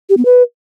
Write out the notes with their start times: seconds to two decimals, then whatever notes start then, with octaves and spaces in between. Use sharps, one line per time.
0.09 G4
0.17 B3
0.25 B4